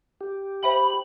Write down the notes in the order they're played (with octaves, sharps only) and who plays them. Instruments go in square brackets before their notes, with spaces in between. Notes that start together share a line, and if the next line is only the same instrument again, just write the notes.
[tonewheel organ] G4
[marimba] C5 E5 G5 [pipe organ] B5